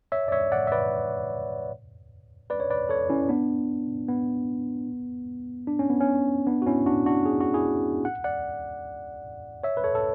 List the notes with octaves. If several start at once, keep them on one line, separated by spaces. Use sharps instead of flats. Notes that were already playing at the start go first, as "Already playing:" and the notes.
C#5 E5
D5
C#5 E5
D5 F#5
E5
B4 D5
B4 D5
C#5
B4 D5
A4 C#5
C#4 E4
B3 D4
B3
D4
C#4
B3
C#4
B3 D4
F#4
C#4 E4
D4 F#4
D4 F#4
G#4
F#4
E4 G#4
F#5
D5 F#5
C#5 E5
B4
A4 C#5
A4